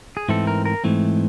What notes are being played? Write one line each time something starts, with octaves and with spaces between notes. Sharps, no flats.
G#4
G#2 E3 A3 C4 A4
A#4
A#4
G#2 E3 A3 C4